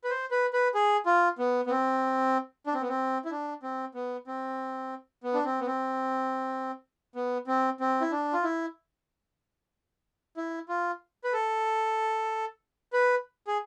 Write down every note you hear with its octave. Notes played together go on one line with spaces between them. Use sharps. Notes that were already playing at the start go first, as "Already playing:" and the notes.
B4
C5
B4
B4
G#4
F4
B3
B3
C4
D4
C4
B3
C4
E4
D4
C4
B3
C4
B3
D4
C4
B3
C4
B3
C4
C4
E4
D4
F4
E4
E4
F4
B4
A4
B4
G#4